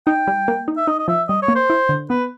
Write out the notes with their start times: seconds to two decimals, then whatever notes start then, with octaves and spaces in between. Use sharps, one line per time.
0.07 D#4 G5
0.27 G3
0.48 A#3
0.68 D#4
0.77 E5
0.87 D#4 D#5
0.99 D#5
1.08 F3 E5
1.28 G3 D#5
1.42 C#5
1.48 A#3
1.56 C5
1.70 E4
1.89 D3
2.10 B3 B4